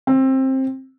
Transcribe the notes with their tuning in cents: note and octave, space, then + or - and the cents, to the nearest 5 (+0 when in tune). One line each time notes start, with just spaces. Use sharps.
C4 +20